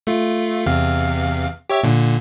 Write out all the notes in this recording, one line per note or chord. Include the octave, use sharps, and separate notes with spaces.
A3 F4
E2 C3 F5
G4 C#5 E5
A#2 D3